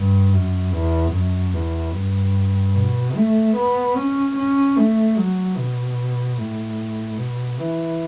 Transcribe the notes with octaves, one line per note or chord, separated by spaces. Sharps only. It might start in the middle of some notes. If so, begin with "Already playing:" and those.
Already playing: G2
F#2
E2
F#2
E2
G2
B2
A3
B3
C#4
C#4
A3
F#3
B2
A2
B2
E3